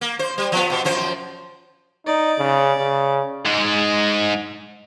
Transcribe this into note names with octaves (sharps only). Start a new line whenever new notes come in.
A#3
C5
G3
F3 B3
B2
F#2 F3 C5
D#4 D5
C#3
C#3
G#2 G#3